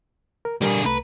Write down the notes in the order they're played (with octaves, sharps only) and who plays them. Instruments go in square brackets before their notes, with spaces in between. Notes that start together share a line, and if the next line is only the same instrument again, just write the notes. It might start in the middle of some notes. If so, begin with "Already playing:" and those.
[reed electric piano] A#4
[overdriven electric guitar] D3 G#4 [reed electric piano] G3 A#4 D5
[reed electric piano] C2 A3 A#5 [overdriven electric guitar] B4